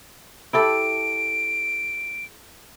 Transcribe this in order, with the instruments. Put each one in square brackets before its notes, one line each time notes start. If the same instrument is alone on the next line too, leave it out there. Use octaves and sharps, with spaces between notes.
[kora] E4 G4 A4 [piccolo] D7